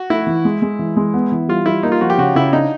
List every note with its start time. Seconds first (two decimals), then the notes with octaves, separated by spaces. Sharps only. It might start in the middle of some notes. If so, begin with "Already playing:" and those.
Already playing: F#4
0.10 A3 E4
0.27 E3
0.45 G#3
0.62 G#3
0.79 E3
0.97 G#3
1.14 B3
1.32 E3
1.48 G3 F4
1.66 G3 E4
1.83 A#3 D#4
1.92 F4
2.01 F3 F#4
2.10 G4
2.18 C#3 F#4
2.35 C#3 E4
2.53 D4 D#4